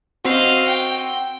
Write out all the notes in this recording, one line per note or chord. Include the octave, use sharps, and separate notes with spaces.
C4 F#4 D#5 F5
G5